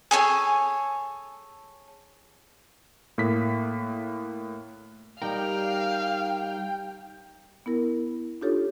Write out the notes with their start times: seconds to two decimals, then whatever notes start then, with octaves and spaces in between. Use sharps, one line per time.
0.11 G#4 A4 C#5 G#5
3.18 A2 A#3 B6
5.22 G3 D#4 A#4 F5 G5
7.66 B3 E4 A#4
8.41 D4 D#4 F4 G4 A4 C#5